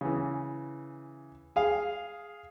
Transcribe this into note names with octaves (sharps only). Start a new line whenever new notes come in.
C#3 E3
G#4 F5